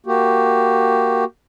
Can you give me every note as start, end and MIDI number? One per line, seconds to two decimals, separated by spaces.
0.06 1.24 58
0.06 1.24 66
0.06 1.24 67